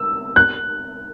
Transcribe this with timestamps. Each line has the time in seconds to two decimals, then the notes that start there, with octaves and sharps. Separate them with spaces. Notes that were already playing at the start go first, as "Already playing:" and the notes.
Already playing: E6
0.36 F#6